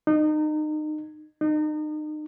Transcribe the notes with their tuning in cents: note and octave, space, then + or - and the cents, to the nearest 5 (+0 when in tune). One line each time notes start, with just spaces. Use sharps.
D#4 -30
D#4 -35